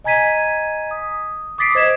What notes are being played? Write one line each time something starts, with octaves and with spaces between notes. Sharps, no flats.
D#5 G#5 A#5 G#6 B6 D#7
D#6
D6 D#6 A6 B6 C7 D7
C5 D#5 G#6 B6 E7